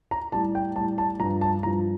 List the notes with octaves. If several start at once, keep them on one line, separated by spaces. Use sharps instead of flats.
A#5
A2 G3 A5
G5
A2 G3 A5
A5
G2 F3 A#5
A5
G2 F3 A#5